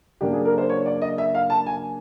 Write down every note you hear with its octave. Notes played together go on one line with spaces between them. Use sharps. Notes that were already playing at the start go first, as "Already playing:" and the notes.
C#3 F#3 A#3 D4 G4
G#4
A#4
C5
C#5
D5
D#5
E5
F5
A5
G#5